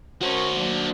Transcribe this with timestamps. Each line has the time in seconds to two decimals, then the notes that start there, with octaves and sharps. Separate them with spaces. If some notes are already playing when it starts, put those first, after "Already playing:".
0.22 C#4 F#4 A#4 C5 C#5
0.55 F#3 A#3 D4